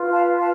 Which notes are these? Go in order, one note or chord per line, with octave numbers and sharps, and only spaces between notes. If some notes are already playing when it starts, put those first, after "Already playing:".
Already playing: F4 B4
F5 A5
F5 A5